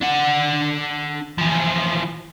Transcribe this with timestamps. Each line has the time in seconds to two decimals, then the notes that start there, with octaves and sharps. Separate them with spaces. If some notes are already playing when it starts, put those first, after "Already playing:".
0.01 D4 F#5
1.38 E3 F3